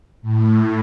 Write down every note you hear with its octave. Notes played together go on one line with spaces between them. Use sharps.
A2